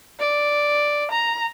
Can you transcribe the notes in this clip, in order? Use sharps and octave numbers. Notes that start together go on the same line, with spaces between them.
D5
A#5